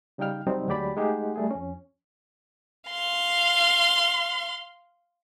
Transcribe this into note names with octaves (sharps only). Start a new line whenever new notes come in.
C#3 G3 D#4 F5 G5 F6
F#2 C3 F#3 G3 C4 D#4
D2 F#3 G#3 G4 D5 B5
G#3 A3 D#4 G4 G#4 F#5
G3 A3 G#4
F2 C#4
F5 C6